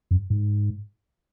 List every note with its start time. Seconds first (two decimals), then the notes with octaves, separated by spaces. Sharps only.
0.11 F#2
0.30 G#2